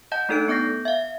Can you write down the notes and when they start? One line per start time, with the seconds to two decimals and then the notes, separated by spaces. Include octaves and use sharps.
0.12 D#5 F#5 A5 G6
0.29 A3 D4 D#4 A4 F#6 D7
0.48 B3 D6 G6 A#6 C7
0.85 E5 F5